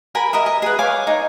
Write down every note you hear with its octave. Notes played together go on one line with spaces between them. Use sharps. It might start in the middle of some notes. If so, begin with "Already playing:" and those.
A#4 G#5 B5
A#4 D#5 E5
D#5
G#4 B4
C#5 F5 G#5 D6
D#4